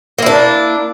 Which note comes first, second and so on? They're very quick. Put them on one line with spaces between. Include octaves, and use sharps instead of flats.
A#3 E4 D4